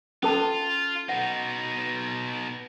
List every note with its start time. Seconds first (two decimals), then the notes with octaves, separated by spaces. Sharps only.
0.23 C#4 F4 A4 A5
1.09 B2 D#4 F#5